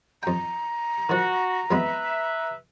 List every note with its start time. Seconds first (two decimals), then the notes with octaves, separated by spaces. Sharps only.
0.23 F2 G5 A#5
1.09 D#3 F3 F#4
1.71 F2 G#3 B3 B4 E5